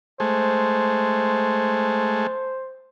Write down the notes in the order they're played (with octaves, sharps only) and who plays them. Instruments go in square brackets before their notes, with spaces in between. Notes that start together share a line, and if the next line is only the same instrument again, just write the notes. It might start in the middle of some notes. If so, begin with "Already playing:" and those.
[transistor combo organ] G#3 A3 [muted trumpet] C5